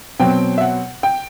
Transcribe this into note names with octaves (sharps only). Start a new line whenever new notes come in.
B2 F#3 C4 G5
E5
F#5
G5